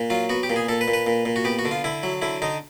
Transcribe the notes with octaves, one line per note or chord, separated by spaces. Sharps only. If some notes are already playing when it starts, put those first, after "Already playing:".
Already playing: A#2
F#3 F4
B3 F#4
G4
A#2
G#4
A#2 A4
B4
A#2
B4
A#2
A#2
F#4
B3 G4
F#4
D3
F4
D3 E4
F#3
D3 E4
D3 D#4